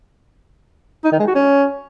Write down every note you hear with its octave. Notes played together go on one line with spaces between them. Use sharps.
D#4
D#3
G#3
F#4
C#4